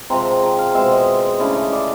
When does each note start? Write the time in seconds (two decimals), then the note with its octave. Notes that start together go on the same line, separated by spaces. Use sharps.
0.10 C3 F3 G#3 C4 A#5
0.43 A#5
0.58 F5
0.75 B2 G#3 C4 E5
0.91 D#5
1.40 C#3 E3 A3 D4 E5
1.56 D#5
1.72 D5